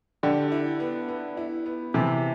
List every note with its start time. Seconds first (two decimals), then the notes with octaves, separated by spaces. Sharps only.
0.23 D3 G4
0.52 E4
0.80 B3
1.09 B3
1.37 E4
1.66 B3
1.94 C3 E3 A4